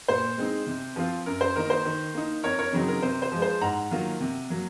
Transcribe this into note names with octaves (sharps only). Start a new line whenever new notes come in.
A#2 C5
G#3 C4 D#4
C3
F3 C4 F4
F#2 A#4
C5
D#3 A#3 D#4 A#4
C5
D#3
A#3 D#4
F2 A#4 C#5
A#4 C#5
C#3 F#3 C4 D#4
A#4
C3 C5
C5
F3 G#3
C5
G#2 F#5 A#5
D#3 F#3 A#3 F4
C3
F#3 A#3